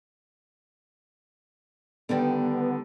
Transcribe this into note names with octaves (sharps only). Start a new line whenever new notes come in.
D3 D#3 G3 B3